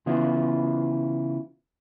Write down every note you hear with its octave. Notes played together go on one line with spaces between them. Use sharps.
C#3 E3 B3 E4 F4